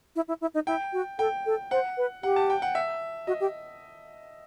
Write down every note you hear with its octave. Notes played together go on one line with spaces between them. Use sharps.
E4
E4
E4
D#4
E4 G5
F#4
A4 G5
A4
C5 F#5
B4
G4 F#5
A5
G5
F#5
E5
F#4 D#5
G4